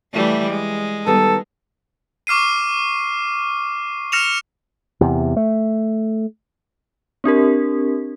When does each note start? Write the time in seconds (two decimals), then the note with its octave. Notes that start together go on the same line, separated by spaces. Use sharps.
0.13 E3 G3 A3
0.49 G#3
1.06 D#3 G3 B3 A4
2.27 C#6 D6 F6 C7 D#7
4.12 F6 A#6 C#7 E7 F7
5.01 E2 C3
5.37 A3
7.24 C4 D4 G4 A#4